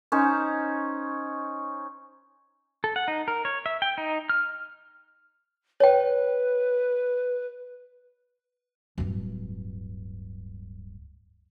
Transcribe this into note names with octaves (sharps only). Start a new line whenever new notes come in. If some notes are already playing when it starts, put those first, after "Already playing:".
C#4 D#4 C5
A4
F#5
D#4
A#4
C#5
E5
G5
D#4
F6
B4 C#5 G5
D1 G2